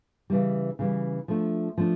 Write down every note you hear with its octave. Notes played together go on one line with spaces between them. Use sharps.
C#3 E3 G3
C#3 E3 G3
F3 A3 D4
F3 A3 D4